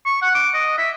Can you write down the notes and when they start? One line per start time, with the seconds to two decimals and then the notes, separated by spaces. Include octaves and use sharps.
0.06 C#6
0.22 F#5
0.35 D6
0.54 D#5
0.78 E5